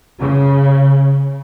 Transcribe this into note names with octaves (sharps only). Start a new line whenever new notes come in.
C#3